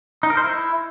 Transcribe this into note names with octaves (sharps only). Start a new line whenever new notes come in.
D#4
A#4
C5
E4